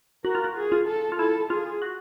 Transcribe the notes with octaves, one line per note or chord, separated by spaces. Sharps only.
F#4 A#4
F4
F#4
G#4
F4
A4
F4
E4 A4
F4 G#4
F#4